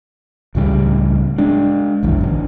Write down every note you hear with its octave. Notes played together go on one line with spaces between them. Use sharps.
C#2 A2 C#3 G3
G#3 D4
G1 C2 F#2 E3
A1 D3